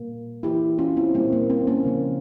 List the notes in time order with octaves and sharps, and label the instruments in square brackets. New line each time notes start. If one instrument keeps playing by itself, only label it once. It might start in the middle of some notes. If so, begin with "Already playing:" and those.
Already playing: [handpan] A#2 G3 A#3
E3 A#3 E4 G4
C#4 F4
C4 E4
A#2 G3 A#3 C4
A#3
C4
A#3 C#4
C#3 F3 A#3